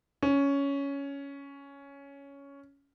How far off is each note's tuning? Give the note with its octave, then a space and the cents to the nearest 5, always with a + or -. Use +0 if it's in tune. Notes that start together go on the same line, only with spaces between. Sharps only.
C#4 +10